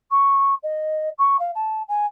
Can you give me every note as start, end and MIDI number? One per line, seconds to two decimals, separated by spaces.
0.11 0.54 85
0.63 1.09 75
1.18 1.37 85
1.39 1.51 77
1.54 1.82 81
1.88 2.06 80